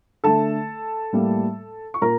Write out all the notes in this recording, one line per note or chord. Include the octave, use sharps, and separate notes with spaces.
D3 A3 A4 A5
A2 G3 A#3
C#6
A#2 A#4 A#5